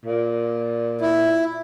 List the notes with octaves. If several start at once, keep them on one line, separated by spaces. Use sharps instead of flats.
A#2
E4